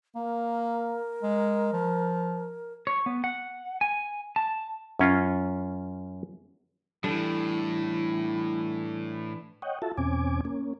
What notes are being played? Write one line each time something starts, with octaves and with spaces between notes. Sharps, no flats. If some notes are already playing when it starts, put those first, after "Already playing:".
A#3 A#4
G#3
F3
C#5
B3
F#5
G#5
A5
F#2 C#4 F4
A2 E3 G3 D4 A4
C#5 D#5 F#5 G5
F4 F#4 A4 E5 A5
E2 B2 C4 C#4 G#5 D6
A#3 C#4